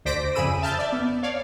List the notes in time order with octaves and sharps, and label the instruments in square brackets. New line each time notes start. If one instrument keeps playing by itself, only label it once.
[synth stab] D2 C5 D5 A#6 B6 D7
F2 C#3 G#4 B5 E6 D#7
E5 A5 F6 G6 A6
D5 E5
B3
C#5 D5 F5